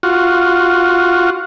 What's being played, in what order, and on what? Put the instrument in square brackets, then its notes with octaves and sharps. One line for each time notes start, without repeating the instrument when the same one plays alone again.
[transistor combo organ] F4 F#4